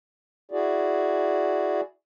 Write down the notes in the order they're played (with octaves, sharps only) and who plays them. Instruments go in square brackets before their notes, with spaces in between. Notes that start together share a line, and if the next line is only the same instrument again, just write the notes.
[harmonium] E4 F#4 G#4 D5